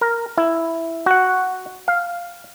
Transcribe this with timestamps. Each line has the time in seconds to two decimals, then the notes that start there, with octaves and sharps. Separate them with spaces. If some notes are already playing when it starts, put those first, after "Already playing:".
0.01 A#4
0.38 E4
1.06 F#4 F#5
1.88 F5